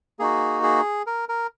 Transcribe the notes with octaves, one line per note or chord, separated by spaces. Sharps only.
A#3 D#4 F#4 G#4
G#4
A#4
A#4